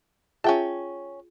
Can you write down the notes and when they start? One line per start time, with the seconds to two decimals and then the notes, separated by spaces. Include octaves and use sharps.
0.44 C#4 F4 G#4 E5 G5 A5